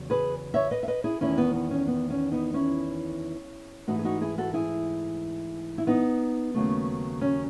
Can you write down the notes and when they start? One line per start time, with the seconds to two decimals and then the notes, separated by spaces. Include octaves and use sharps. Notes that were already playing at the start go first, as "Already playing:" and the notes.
Already playing: E2 C#3 F#3
0.10 G#4 B4
0.54 C#5 E5
0.71 B4 D#5
0.83 E5
0.88 B4 D#5
1.04 E4 G#4
1.21 E2 D#3 A3 C#4 E4
1.38 B3
1.54 B3
1.71 C#4
1.87 B3
2.10 C#4
2.32 B3 D#4
2.54 C#4 E4
3.87 G#2 E3 A3 D#4 F#4
3.99 G#4
4.04 D#4 F#4
4.21 E4 G#4
4.38 F#4 A4
4.54 E4 G#4
5.78 E4
5.87 B3 D#4
6.54 D#2 C#3 F#3 A3
7.21 C#4